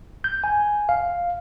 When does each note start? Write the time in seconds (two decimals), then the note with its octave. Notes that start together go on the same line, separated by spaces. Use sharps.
0.24 G6
0.44 G#5
0.89 F5